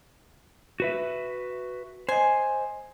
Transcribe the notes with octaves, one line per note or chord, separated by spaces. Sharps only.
F#4 B4 E5
C5 D#5 G#5